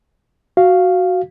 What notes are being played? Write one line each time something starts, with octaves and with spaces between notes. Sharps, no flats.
F#4 F5